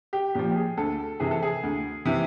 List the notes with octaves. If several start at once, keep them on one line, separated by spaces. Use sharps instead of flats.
G4
A#2 F3 G4
G#4
D2 A4
C3 E3 G#4
A4
G#4
D2
C3 E3